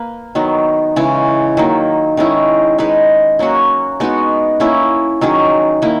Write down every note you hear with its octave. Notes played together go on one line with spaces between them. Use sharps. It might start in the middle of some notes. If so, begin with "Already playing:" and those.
Already playing: A#3 B4
D#3 F#3 B3
C#3 E3 G#3 C#4
D#3 F#3 A#3
D#3 G#3 C#4 E4
G#3 D#4 G#4 B4
F#3 A#3 C#4 F#4
G#3 B3 D#4 F#4
A#3 C#4 E4
D#3 F#3 C#4 G#4
D#3 A#3 E4